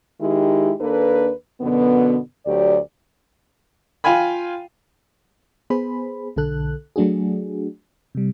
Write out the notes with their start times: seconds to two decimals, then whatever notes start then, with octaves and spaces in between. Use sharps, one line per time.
0.21 D#3 G#3 D#4 E4 G4
0.80 D#2 A#3 D4 A4 B4
1.61 F#2 B2 D3 B3
2.46 D2 F#3 G4 D5
4.04 F4 F5 G5 G#5 B5
5.70 B3 G#4 C5 B5
6.36 B1 D3 A4 F#6
6.96 F#3 A3 D4 F#4 G#4
8.15 C3 G3